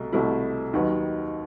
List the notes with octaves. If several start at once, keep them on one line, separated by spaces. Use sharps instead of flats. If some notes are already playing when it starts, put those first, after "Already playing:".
Already playing: C2 B2 A3
C2 B2 A3 E4
D#2 D#3 F#3 B3